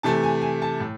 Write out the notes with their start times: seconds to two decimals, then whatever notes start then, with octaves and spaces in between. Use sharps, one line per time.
0.03 C3 E3 A3 A5
0.23 G#5
0.42 G#5
0.62 A5
0.80 A2